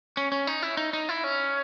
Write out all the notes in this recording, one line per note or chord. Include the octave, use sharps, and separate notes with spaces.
C#4
C#4
D#4
E4
D#4
D#4
E4
C#4